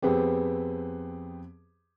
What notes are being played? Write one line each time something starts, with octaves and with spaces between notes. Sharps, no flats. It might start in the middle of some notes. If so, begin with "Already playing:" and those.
F2 B3 C4 G4 G#4 B4